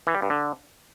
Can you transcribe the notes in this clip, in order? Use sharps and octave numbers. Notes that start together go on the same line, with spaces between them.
E3
G3
G2
D3